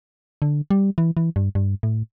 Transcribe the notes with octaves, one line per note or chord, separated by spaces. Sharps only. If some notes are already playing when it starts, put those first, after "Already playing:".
D3
G3
E3
E3
G2
G2
A2